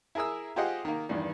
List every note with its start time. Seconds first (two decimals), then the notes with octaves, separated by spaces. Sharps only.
0.15 E4 G#4 A#4 D#6 E6
0.56 F4 G4 G#4 C5 D#5 F#5
0.85 D#3 A#3
1.09 E2 G2 D#3